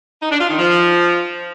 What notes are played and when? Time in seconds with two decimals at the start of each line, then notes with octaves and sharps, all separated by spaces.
0.23 D#4
0.32 D4
0.41 F4
0.50 D#3
0.59 F3